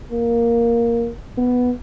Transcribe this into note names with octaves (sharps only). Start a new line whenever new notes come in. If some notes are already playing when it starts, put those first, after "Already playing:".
A#3
B3